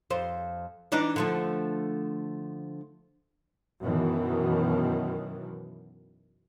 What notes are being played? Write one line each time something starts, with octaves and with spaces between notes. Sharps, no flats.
F2 C5
E3 D4 D#4
D3 F3 A3
F#2 B2 D#3 E3